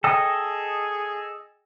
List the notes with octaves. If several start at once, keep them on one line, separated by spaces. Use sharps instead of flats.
G#4 A4 D#5 G5